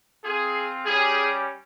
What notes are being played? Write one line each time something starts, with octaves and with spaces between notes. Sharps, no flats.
C4 F4 G#4
G3 C#4 G4 G#4